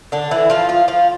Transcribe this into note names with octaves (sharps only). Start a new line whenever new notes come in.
D3 D4
E3 E4
F3 F4
F3 F4
F3 F4